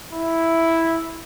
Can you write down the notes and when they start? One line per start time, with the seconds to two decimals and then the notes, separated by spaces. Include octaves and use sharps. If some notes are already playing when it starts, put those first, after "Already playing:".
0.13 E4